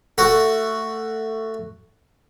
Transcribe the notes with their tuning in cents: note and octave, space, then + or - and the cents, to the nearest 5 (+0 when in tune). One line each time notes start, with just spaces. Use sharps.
A3 +15 F#4 +0